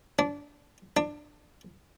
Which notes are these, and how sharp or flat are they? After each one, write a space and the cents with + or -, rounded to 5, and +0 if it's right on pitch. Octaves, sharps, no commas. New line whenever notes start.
D4 -20
D4 +20